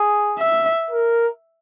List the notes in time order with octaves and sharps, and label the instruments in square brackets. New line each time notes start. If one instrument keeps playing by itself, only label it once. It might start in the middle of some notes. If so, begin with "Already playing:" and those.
Already playing: [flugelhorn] G#4
[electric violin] E5
[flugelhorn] A#4